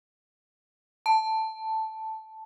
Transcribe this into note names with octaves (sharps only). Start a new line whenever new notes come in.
A5